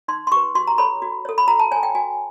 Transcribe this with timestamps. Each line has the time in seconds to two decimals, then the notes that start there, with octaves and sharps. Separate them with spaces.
0.08 D#4 C6
0.27 C6
0.32 G4 C#6
0.36 B4
0.55 F#4 C6
0.67 A#5
0.78 A4 C#5 B5
1.02 F#4
1.25 A4 C#5
1.38 B5
1.48 F#4 A#5
1.60 A5
1.71 C#5 G#5
1.76 A4
1.83 G5
1.95 F#4 G#5